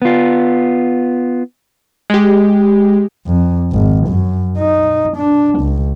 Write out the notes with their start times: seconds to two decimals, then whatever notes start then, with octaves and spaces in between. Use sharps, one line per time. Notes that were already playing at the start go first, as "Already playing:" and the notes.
0.02 B3 F4
2.10 G#3 G4
3.27 F2
3.73 G#1
4.08 F#2
4.58 D#4
5.17 D4
5.60 C#2